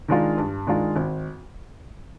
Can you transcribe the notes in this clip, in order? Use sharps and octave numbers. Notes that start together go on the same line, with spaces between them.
D#3 G#3 D4 F4
G2
D#3 G#3 D4 F4
G#1